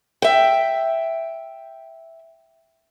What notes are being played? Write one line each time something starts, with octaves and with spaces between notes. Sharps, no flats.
E5 G5